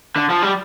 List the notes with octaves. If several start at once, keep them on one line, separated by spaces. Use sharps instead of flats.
D3
F3
G3